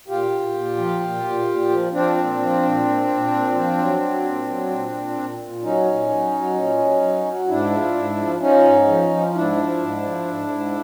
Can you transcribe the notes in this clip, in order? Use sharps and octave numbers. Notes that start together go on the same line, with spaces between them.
A#2 F4 G4
A#2
A#2
F3
A#2
A#2
A#2
F3
F3 C4 D4
A#2
F3
A#2
A#2
A#2
A#2
F3
F#3
F#3
A#2
F#3
A#2
A#2
A#2
A#2
F#3 C#4 D#4
A#2
F#3
F#3
A#2
F#3
F#3
F#3
G#2 D4 E4
F3
G#2
F3
F3 C#4 D#4
G#2
F3
F3
G#2 D4 E4
F3
G#2
F3
G#2
G#2